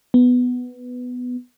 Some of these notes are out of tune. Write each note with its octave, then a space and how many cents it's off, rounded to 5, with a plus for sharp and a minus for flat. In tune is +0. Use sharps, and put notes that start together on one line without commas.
B3 +5